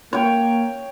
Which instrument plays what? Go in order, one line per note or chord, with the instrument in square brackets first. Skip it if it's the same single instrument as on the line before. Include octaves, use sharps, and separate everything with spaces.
[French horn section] A#3 [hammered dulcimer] C#5 G5